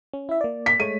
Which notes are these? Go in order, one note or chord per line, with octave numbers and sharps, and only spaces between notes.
C#4
E4 E5
A#3 D5
B6
G#3 A3 C#5 D#7